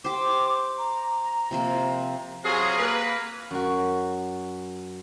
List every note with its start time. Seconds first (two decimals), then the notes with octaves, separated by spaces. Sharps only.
0.04 G4 C5 D6
0.78 A#5
1.51 C3 F3 A#3
2.44 C3 F#3 F4 G#4
2.77 A#3 B4
3.51 F#2 F#4